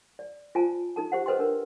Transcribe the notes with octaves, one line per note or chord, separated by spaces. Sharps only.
D5
F4 C5 G#5 A5
D#4 A4 A5
G4 C5 F#5
A4 B4 C5 D#5 G5 C6
D4 A#4 B4